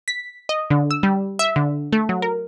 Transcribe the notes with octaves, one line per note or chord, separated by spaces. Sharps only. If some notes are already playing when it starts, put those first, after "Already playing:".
B6
D#5
D3
E6
G3
E5
D3
A3
F#3
A#4